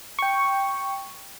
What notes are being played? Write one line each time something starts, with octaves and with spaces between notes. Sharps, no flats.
G5 C#6